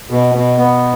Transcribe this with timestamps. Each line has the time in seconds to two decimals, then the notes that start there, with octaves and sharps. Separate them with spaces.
0.10 B2
0.35 B2
0.58 B3